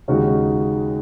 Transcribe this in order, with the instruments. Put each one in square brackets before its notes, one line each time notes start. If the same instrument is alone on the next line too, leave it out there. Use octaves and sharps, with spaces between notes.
[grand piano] D#2 C#3 G#3 D#4 F#4